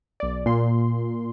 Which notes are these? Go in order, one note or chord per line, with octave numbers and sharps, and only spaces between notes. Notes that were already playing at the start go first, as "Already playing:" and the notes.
B1 D5
A#2 C6